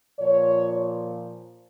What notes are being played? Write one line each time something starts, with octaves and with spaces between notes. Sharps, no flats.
A#2 F3 C#5